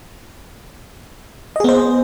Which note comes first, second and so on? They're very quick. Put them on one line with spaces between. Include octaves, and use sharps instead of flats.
D#5 G#4 B3 C5